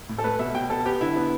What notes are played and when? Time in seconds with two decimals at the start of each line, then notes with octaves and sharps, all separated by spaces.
0.09 A2
0.18 A4
0.24 A3 B4
0.39 B2 E5
0.55 B2 G5
0.70 B2 A4
0.85 B3 G4
1.01 D3 E4
1.16 B3